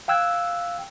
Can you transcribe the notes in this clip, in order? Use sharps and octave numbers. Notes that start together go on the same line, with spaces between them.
F5 G5 E6 F#6 G#6